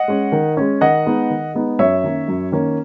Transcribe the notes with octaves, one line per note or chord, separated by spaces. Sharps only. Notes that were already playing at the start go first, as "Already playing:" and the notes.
Already playing: D#5 F#5
G#3 C#4
D#3
G#3 C#4
D#3 D#5 F#5
G#3 B3 D#4
D#3
G#3 B3 D#4
F#2 C#5 E5
D#3 A#3 C#4
F#2
D#3 A#3 C#4